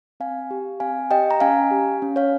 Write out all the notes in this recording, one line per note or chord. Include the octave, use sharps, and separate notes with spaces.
C4 F5 G#5
G4
C4 F5 G#5
G4 D#5 G5
A#5
C#4 F5 G#5
G4
C#4
C#5 F5